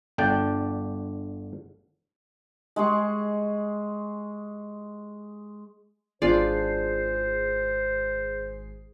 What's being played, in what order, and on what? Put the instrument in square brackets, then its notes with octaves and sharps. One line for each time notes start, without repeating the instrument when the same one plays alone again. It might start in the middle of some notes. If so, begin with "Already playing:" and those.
[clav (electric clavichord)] G1 D3 D4 D5 G5
[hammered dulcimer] G#3 G#4 C#6
[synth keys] G#1 G#4 C7 [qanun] D4 F4 D5 [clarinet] C5